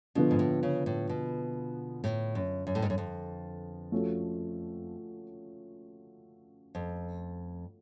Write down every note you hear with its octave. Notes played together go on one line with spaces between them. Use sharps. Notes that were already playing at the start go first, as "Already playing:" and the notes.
B2 D3 F3 B3
G#2
A2
C#3
A2
B2
A2
F#2
F#2
A2
G#2
F#2
F2
F3 A3 C#4 F#4
F2